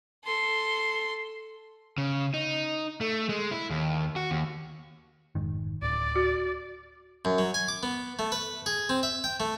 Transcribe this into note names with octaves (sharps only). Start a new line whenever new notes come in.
A4 C6
C#3
D#4
A3
G#3
E4
D#2
F#4
D#2
F1 G#2 D#3
D1 D5
F#4
F#2
F#3
G#5
D6
B3
A3
B4
G#4
C4
E5
G5
A3